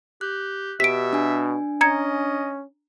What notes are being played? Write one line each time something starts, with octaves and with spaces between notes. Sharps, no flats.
G4 F#6
B2 G4 E5 B6 D7
D4 G#5
C#4 D#5 A#5 G#6 C#7